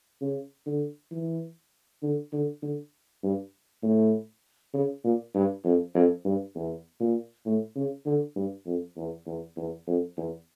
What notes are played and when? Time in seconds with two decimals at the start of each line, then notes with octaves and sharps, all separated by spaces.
0.21 C#3
0.67 D3
1.12 E3
2.03 D3
2.33 D3
2.63 D3
3.23 G2
3.83 A2
4.74 C#3
5.04 A#2
5.35 G2
5.65 F2
5.95 F2
6.25 G2
6.55 E2
7.01 A#2
7.46 A2
7.76 C#3
8.06 D3
8.36 G2
8.66 F2
8.97 E2
9.26 E2
9.57 E2
9.87 F2
10.17 E2